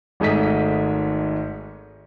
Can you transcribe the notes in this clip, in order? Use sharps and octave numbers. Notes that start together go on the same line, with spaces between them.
G#1 G#2 A3 D#5 B6